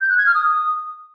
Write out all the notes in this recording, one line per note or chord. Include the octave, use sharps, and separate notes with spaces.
G6
F#6
G#6
F6
D#6